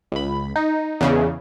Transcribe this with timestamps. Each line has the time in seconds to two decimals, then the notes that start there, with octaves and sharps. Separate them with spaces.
0.12 C#2 B5
0.56 D#4
1.01 E2 C#3